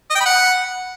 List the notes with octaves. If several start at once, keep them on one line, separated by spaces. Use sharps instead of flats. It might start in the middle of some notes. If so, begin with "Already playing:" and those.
D#5
G5
B5
F#5